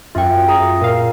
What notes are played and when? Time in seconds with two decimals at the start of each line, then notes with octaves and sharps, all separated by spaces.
0.15 F#2 F4 E5 G5
0.48 G#4 A#5 D#6
0.81 A#2 A#4 F5